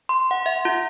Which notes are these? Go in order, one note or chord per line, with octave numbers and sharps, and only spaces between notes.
C6
F#5
E5
F4